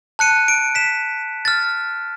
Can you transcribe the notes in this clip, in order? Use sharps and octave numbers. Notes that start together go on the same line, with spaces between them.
A5 F#6 C#7 D#7
D7
B6 E7
F6 A6